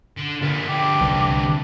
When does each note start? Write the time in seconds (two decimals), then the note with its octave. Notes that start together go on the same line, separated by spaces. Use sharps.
0.17 D3
0.41 D2 B3 F4 A#4
0.69 D4 G5 D6
1.01 C2 E3 G3